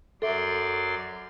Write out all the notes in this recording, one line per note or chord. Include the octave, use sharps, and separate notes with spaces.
F#2 A4 D5 E5 C6